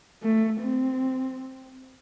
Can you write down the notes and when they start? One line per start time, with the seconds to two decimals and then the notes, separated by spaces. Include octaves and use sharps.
0.23 A3
0.60 C4